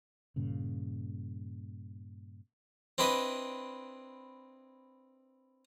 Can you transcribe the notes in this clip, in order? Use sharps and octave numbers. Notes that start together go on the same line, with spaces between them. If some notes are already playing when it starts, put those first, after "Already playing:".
G2 A#2 C#3
C4 D4 E4 B4 D#5